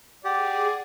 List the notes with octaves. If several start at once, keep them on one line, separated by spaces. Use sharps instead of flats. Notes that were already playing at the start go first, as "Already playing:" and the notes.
G4 G#4 D5 F#5